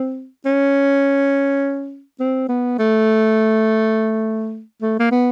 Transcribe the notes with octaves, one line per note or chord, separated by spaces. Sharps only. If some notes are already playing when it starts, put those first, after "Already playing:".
Already playing: C4
C#4
C4
B3
A3
A3
A#3
B3